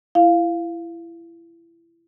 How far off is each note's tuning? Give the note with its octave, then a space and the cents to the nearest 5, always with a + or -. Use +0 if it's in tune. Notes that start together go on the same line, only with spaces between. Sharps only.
E4 +25 F5 +0